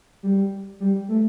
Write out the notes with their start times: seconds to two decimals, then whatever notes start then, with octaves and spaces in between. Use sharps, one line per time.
0.23 G3
0.80 G3
1.09 A3